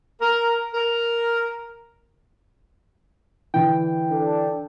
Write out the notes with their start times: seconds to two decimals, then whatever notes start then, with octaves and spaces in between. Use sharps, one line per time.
0.22 A#4
0.74 A#4
3.54 D3 E3 G5
4.10 D4 A4